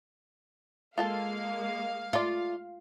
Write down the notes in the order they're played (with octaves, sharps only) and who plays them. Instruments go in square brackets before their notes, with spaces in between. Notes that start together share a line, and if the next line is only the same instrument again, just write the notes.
[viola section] G#3 A#3 [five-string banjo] F4 A4 A5 [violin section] F5
[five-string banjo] A3 D5 [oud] F4